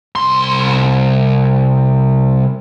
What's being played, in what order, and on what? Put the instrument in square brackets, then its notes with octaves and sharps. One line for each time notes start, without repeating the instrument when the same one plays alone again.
[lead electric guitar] C2 C6